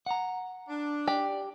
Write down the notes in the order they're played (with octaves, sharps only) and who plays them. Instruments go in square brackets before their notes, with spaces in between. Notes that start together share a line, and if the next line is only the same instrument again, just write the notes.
[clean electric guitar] F#5 A#5
[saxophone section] D4
[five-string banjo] G4 [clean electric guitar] D5